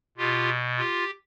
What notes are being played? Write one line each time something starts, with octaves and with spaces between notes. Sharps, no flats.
B2 F4 G4
F4 G4